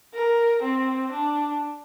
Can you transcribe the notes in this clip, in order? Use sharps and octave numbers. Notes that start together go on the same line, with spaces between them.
A#4
C4
D4